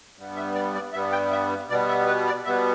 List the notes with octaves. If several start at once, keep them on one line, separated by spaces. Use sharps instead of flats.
G2 G3 B3
E5
D5
D5
G2 G3 B3 E5
G5
E5
B2 G3 B3 D5
E5
B4
D5
B2 G3 B3 E5